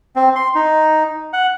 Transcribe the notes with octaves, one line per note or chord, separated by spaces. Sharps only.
C4
C6
D#4
F#5